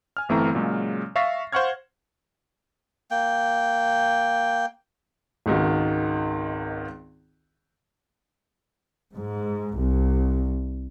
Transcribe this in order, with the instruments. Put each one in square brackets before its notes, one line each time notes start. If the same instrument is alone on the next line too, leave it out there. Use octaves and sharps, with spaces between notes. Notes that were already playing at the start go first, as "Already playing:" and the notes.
[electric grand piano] G#5 F6
G1 E3 A3 C4 E4 A#5
A#2 C#3 F#3 G#3
E5 F5 C#6 A6 A#6 C7
C5 F5 F#5 C#6 F6 G#6
[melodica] A#3 G5
[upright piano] G#1 C#2 D#3 F#4
[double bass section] G#2
C2